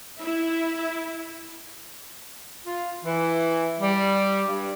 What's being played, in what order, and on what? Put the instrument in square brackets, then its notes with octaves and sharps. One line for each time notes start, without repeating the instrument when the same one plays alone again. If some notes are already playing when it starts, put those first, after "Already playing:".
[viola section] E4 E5
[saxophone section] F4
E3
G3
G2